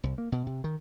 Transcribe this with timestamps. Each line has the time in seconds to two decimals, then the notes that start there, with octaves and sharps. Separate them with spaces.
0.03 C2
0.18 A#3
0.32 B2
0.47 C3
0.64 D#3